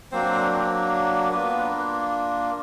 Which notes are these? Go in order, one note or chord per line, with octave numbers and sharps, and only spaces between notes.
F#3 A#3 C4 D4 C5
A#3 B3 D4 F4 B4